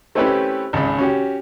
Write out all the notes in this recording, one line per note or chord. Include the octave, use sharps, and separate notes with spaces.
A3 C4 C#4 E4 G4 B4
G#1 C#2 B5
C#4 F#4 G4